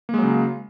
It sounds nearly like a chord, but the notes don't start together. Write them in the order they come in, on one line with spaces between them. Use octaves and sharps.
A#3 G#3 F#3 C#3